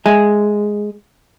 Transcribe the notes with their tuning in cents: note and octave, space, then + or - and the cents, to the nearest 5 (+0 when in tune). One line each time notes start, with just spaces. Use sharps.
G#3 +0 E5 +0 G#5 +0